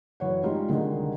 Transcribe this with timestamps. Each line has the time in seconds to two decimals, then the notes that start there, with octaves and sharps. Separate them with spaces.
0.20 F#2 E3 C#5 F#5
0.43 G3 G#3 D#4 F4 G#4
0.69 C2 D3 D#3 G#3